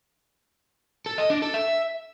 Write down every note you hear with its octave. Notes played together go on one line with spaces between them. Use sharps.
A4
D#5
D4
A4
E5